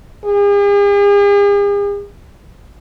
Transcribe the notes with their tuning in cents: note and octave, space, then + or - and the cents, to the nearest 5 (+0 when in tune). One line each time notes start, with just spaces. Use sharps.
G#4 -45